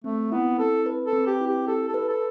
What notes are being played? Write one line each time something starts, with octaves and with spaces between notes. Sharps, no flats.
A3 C4
B3 E4
C4 A4
B4
A4
C4
G4
E4
G4
G4 A4
A4
B4
A4